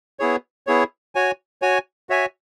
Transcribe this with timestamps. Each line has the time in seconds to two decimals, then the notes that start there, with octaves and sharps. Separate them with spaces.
0.19 B3 E4 G#4 C#5
0.67 B3 E4 G#4 C#5
1.15 F#4 C#5 G#5
1.62 F#4 C#5 G#5
2.09 F#4 C#5 E5 G#5